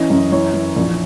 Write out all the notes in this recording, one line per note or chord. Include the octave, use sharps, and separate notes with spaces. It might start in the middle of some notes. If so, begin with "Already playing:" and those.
Already playing: E3 C#4 D#5
F#2
E3 C#5
E3
A#1